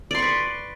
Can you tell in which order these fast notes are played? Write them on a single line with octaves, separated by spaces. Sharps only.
D5 C6 C#6 B4